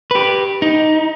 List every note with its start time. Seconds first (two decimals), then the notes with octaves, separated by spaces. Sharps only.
0.11 G4 B4
0.62 D#4